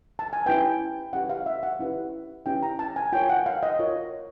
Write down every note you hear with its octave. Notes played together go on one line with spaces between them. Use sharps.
A5
G#5
C#4 E4 G4 B4 G5
C#4 E4 G4 B4 F#5
F5
E5
F#5
C#4 E4 G4 B4
C#4 E4 G4 B4 G5
A#5
A5
G#5
F4 A#4 C#5 G5
F#5
F5
D#5
F4 A#4 C#5